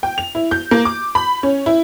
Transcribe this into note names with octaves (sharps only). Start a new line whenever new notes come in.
G5
F7
E4
G6
A#3
D6
B5
C#4
E4